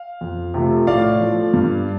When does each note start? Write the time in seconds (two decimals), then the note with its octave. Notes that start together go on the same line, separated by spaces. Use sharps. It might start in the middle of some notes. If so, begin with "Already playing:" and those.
Already playing: F5
0.21 F2
0.54 C3 F3 A3
0.87 A2 D5 F5
1.20 F3 A3
1.54 G2